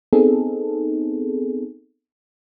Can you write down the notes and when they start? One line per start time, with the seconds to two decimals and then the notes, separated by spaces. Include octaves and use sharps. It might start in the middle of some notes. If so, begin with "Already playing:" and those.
0.13 B3 C4 D#4 G#4 A4